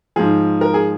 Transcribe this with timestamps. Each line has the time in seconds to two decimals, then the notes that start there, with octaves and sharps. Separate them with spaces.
0.16 G#2 F3 G#4
0.61 A#4
0.74 G#4